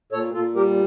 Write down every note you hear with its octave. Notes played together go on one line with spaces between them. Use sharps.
A#2 A4 C#5
A#2 F4 A4
G3 G4 A#4